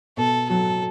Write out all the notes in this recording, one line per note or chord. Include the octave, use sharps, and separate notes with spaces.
B2 A4
F#3 A4